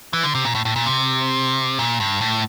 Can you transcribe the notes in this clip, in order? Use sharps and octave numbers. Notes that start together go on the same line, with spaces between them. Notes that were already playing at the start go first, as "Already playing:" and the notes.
E3
D3
C3
A#2
A2
A2
A#2
C3
A#2
G2
A2